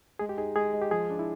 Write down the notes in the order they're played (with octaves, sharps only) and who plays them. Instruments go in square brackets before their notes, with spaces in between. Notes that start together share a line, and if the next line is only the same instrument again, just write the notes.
[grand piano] G#3 [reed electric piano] G#4
[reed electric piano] G4
[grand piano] D#4 [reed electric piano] G#4
[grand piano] G#3 [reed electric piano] G#4
[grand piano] G#3
[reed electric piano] G4
[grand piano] F3 [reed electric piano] G#4
[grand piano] D4
[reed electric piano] E4